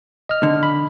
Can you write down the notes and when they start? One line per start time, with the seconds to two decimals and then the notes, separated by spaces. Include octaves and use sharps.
0.29 D#5 F6
0.43 D3
0.63 B5